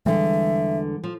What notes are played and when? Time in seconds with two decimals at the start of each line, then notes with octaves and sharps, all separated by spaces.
0.06 E2 D3 E3 G3 G#3 E5
1.04 F3